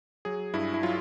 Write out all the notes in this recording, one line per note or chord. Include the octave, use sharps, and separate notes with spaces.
F#3 G#4
G2 E4
E4
F#3 F4